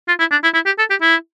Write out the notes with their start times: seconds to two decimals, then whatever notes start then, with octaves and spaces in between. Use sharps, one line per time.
0.08 F4
0.19 E4
0.31 D4
0.43 E4
0.54 E4
0.66 G4
0.78 A4
0.90 G4
1.01 E4